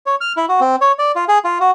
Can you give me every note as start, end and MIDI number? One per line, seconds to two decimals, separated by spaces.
0.06 0.15 73
0.21 0.33 89
0.37 0.46 64
0.49 0.60 66
0.61 0.76 60
0.81 0.92 73
0.99 1.12 74
1.16 1.25 65
1.28 1.38 68
1.44 1.58 65
1.60 1.71 66